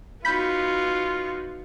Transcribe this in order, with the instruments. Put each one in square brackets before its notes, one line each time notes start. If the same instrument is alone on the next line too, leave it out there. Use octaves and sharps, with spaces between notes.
[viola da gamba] B3 D#4 F#4 [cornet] F4 [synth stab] B5 G6